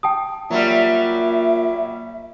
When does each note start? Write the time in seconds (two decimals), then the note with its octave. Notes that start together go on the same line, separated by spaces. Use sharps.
0.03 G5 A5 D#6
0.51 A#2 F#3 G3 E5